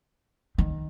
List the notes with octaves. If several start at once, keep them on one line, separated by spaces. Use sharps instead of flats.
D#3